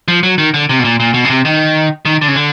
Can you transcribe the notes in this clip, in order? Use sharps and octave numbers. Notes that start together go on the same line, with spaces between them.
F3
F#3
D#3
D3
C3
B2
A#2
A#2
B2
C#3
C3
D#3
D#3
D3
C#3
D3